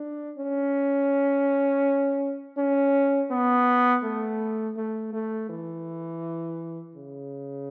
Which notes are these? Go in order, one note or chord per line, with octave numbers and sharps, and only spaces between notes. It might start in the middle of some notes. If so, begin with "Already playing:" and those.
Already playing: D4
C#4
C#4
B3
A3
A3
A3
E3
C#3